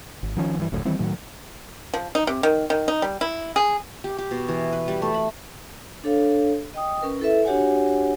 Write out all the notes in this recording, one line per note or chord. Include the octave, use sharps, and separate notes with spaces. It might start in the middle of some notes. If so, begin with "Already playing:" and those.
G#1
D#3 F3 B3 C#4
G2 E3
F#1 D2 A2
D#3 E3 G3 C4
A2 D#3 F#3
F3
D#4
C3
D#3
D#3
D#4
G3
E4
G#4
G4
G4
B2
E3
B4
G3
A3
B5
D4 A4 C#5 F5
D#5 G5 D#6
C#4 A#4 B4
E4 A4 B4 E5
D4 F#4 G4 C#5 F#5 G#5